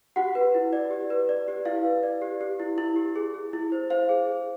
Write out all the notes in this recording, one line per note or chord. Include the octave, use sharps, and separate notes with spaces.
F#4 G4 F#5
B4
E4
D5
G4
B4
D5
G4
E4 F5
B4
D5
G4
G4
E4
E4
G4
G#4
G#4
E4
C5
C5 F5
G#4
G#4